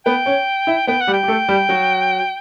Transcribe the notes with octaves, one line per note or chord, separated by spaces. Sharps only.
B3 B4 G5
C#4 C#5
E4 E5
B3 B4 G5
F#5
G3 G4
G5
G4
A3 A4
G3 G4
F#3 F#4